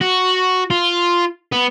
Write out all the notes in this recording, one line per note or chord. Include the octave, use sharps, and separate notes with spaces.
F#4
F4
B3